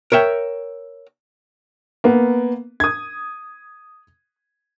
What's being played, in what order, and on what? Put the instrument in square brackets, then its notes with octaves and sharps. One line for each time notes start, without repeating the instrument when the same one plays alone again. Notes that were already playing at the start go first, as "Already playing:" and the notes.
[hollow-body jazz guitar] A#4 C#5 E5 G5
[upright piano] A#3 B3
D#6 G#6